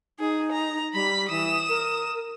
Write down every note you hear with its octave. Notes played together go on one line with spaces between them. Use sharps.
D#4 G#4
A#5
G3 B5 B6
E3 D#6 E7
A#4